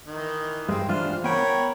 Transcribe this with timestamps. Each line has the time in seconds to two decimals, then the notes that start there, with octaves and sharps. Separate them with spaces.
0.07 D#3 E3 D#5
0.69 G2 G#3 C4
0.89 E3 D4 F4 C5 F6
1.24 B3 A#4 C#5 G5 B5